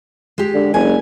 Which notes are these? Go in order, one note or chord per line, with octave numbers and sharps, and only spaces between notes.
G#3 G4
D3
F#1 G#5